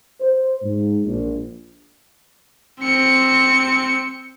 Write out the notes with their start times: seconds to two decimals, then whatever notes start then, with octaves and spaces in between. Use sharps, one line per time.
0.21 C5
0.62 G#2
1.05 A#1
2.82 C4 C#7